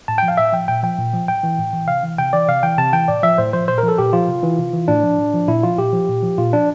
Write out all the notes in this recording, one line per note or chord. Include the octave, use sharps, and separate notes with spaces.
A2 A5
F3 G5
F5
A2 E5
F3 G5
A#2 G5
F3 G5
A#2
F3
A2 G5
E3
A2
E3
C3 F5
E3
C3 G5
E3 D5
C3 F5
E3 G5
C3 A5
E3 G5
A2 D5
F3 E5
A2 C5
F3 C5
A#2 C5
A#4
F3
A4
A#2 G4
F3 F4
C3
E3
C3
E3
A2 D4
F3
A2
F3
A#2 E4
F3 F4
A#2 G4
F3
A#2
F3
A#2 F4
F3 D4